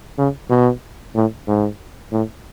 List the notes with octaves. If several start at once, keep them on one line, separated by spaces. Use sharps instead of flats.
C#3
B2
A2
G#2
A2